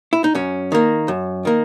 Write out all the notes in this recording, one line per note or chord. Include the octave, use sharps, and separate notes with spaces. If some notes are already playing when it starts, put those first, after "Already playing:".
E4
D#4
F#2 C#4
D#3 A#3
F#2
D#3 A#3